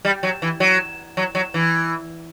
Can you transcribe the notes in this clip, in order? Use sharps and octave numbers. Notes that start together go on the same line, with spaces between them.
G3
F#3
E3
F#3
F#3
F#3
E3